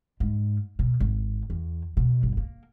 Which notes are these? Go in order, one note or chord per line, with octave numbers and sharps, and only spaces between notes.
G#2
B2
G#1
E2
B2
G1
A#3